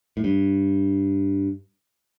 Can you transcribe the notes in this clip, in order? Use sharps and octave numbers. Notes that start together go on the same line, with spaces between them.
A2
G2